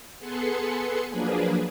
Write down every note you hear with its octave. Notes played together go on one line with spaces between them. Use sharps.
B3 G#4 A4 B4 C6 C#7
F3 F#3 A#3 D4 G#4 B4